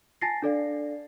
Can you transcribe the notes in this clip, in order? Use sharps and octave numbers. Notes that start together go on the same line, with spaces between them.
G#5 A5 A6 A#6 C7
D4 A4 D5 F5